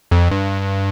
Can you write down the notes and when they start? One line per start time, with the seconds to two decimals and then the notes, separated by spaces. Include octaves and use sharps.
0.11 F2
0.31 G2